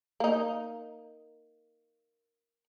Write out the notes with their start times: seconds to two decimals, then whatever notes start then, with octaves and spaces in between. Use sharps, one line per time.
0.20 A#3 D#4